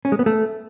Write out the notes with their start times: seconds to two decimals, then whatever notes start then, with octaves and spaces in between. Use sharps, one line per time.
0.05 C#4
0.12 G#3
0.19 B3
0.26 A3